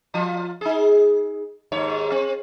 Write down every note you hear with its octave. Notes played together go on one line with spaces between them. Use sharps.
F3 F4
D#4 G#4
D#2 G#2 C#5
C4